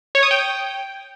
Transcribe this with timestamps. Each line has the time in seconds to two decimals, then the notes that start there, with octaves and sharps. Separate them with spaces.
0.15 C#5
0.23 D#6
0.31 G5